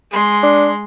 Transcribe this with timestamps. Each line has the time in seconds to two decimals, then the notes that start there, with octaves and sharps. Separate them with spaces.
0.11 G#3 C6
0.43 D4